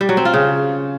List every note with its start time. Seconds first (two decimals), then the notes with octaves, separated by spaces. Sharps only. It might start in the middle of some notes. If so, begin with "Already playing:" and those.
0.01 G3
0.09 F#3
0.17 C4
0.25 F4
0.34 C#3